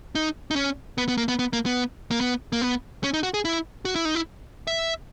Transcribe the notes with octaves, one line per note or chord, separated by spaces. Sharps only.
D#4
D#4
C#4
B3
B3
A#3
B3
B3
A#3
B3
A#3
B3
A#3
B3
C#4
D#4
F#4
G#4
E4
F#4
E4
D#4
E4
E5